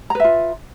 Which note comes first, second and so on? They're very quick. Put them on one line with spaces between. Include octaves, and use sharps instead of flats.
A#5 B4 E5 F4